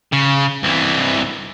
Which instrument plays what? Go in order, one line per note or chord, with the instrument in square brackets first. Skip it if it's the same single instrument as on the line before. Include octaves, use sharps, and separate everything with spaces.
[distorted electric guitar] C#3
C2 E3